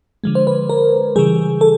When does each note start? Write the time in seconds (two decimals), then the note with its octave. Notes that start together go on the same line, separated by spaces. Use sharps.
0.24 D3 F3 G#3
0.35 C5
0.47 B4
0.69 A#4
1.16 C#3 E3 G3 G#4
1.61 A4